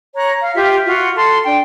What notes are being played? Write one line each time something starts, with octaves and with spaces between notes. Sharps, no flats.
C#5 A#5 F#6
F5
F4 G4 E5
F4 F#4
A4 C6
D4 G5